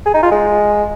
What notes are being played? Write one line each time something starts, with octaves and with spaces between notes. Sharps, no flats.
G#4
D#4
F4
G#3